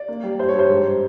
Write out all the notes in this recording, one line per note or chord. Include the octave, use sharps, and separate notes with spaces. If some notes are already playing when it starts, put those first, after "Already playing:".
Already playing: D5
A#3
G3
G2 C5
C#5
G2 C5
G#2